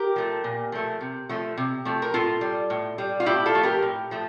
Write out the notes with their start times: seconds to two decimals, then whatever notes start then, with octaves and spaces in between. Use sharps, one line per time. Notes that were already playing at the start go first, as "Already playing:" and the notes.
Already playing: G4 A#4
0.16 F3 A3
0.44 A#2
0.72 F3 A3
1.00 C3
1.29 F3 A3
1.57 C3
1.85 F3 A3
2.02 A#4
2.14 A2 F4 A4
2.41 G3
2.70 A2
2.98 G3
3.20 F4
3.26 A2 E4 G4
3.46 F4 A4
3.55 F3 A3
3.63 G4 A#4
3.82 A2
4.11 F3 A3